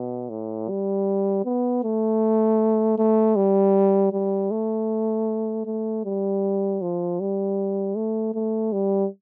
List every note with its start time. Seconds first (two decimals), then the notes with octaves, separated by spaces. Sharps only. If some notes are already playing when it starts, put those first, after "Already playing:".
Already playing: B2
0.30 A2
0.69 G3
1.45 B3
1.84 A3
2.98 A3
3.36 G3
4.13 G3
4.51 A3
5.66 A3
6.05 G3
6.82 F3
7.21 G3
7.97 A3
8.35 A3
8.73 G3